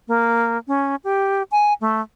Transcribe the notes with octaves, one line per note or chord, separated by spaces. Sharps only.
A#3
C#4
G4
G#5
A3